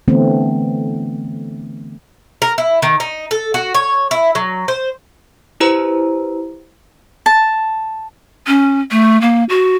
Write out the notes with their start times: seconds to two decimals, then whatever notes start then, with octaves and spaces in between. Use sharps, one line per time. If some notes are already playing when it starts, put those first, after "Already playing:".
0.08 D3 E3 A3 B3 C4
2.42 A#4
2.58 E4
2.82 D#3
3.00 D#4
3.31 A4
3.54 F#4
3.75 C#5
4.11 E4
4.35 F#3
4.68 C5
5.60 E4 G4 B4 C5 A#5
7.26 A5
8.47 C#4
8.91 A3
9.21 A#3
9.49 F#4